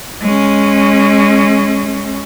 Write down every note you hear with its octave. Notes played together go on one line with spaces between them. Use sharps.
G#3 C#4